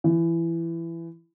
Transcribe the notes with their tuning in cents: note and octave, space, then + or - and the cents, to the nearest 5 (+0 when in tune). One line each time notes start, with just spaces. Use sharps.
E3 +20